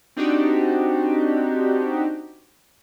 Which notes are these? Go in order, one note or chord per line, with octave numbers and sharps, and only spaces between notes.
C4 D4 D#4 F#4 G4